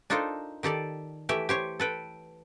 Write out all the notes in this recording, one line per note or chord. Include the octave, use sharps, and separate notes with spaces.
D4 D#4 F4 A4 A#4 C5
D#3 G4 A4 D5
E3 A3 G4 E5
G4 C5 C#5
A4 B4 G5